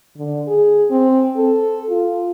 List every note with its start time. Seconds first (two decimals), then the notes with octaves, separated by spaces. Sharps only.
0.17 D3
0.47 G#4
0.90 C4
1.37 A4
1.89 F4